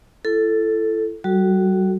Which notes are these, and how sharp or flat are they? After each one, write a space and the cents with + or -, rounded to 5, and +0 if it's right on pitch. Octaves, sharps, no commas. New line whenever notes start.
E4 +35 A4 +0
G3 -40 F#4 +0 A4 +0